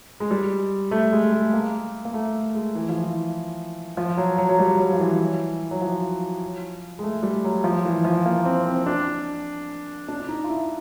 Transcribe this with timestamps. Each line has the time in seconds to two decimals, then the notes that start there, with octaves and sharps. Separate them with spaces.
0.20 G#3
0.31 G3
0.91 A3
1.13 G#3
1.32 A3
1.53 A#3
2.05 A#3
2.14 A3
2.55 G#3
2.75 E3
2.89 F3
3.03 E3
3.97 F3
4.17 F#3
4.38 F#3
4.49 F#3
4.59 G3
4.79 F#3
4.93 F3
4.99 E3
5.71 F#3
5.81 F3
6.99 G#3
7.03 A3
7.23 G3
7.44 F#3
7.64 F3
7.85 E3
8.05 F3
8.26 A#3
8.45 C4
8.66 C4
8.86 D4
10.08 D4
10.20 D4
10.29 D#4
10.44 F4
10.49 E4